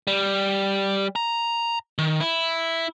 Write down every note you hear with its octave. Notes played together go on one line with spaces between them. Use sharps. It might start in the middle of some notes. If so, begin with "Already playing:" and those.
G3
A#5
D#3
E4